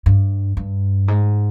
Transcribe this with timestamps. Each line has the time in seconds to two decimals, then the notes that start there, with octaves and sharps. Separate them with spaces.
0.06 G2
0.57 G2
1.08 G#2